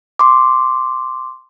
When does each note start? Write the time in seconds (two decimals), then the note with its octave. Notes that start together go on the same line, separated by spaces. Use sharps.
0.19 C6 D6